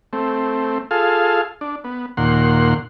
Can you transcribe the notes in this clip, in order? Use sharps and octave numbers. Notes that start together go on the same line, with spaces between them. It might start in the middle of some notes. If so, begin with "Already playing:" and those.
A3 C4
F4 G#4 A4 F5
D4
B3
D#2 A#2 F#5 C6